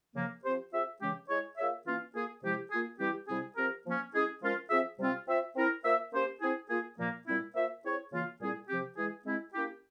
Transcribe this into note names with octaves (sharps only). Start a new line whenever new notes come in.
C#3 F3 A#3
F3 C4 G4 C5
C4 F4 G#4 E5
C#3 E3 G#3 C#4 G4
G#3 E4 G#4 C#5
A#3 F4 G#4 C#5 E5
E3 A#3 C#4 F4
A#3 F4 G#4
C3 F3 G#3 E4 G4
A#3 F4 G#4
E3 G3 C4 E4 G4
C3 G3 C4 E4 G#4
F3 C4 G4 A#4
F3 A#3 C#4
G#3 C#4 E4 G#4
F3 G#3 C#4 F4 A#4
F3 C4 F4 G#4 E5
C3 G3 C4 F4
C4 F4 C5 E5
C4 E4 A#4
A#3 F4 C5 E5
A#3 C#4 G4 C5
C4 E4 G#4
A#3 F4 G#4
A#2 F3 A#3
A#2 G3 C4 E4
A#3 F4 C5 E5
C4 E4 G#4 C#5
C#3 E3 A#3 F4
A#2 G3 C4 E4 G#4
C3 F3 C4 G4
E3 G#3 E4 G#4
G#3 C4 E4
A#3 C#4 E4 G4